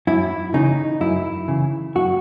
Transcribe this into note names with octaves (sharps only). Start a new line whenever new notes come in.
F#2 E4
C#3 E3 D#4
F#2 E4
C#3 E3
F#2 F#4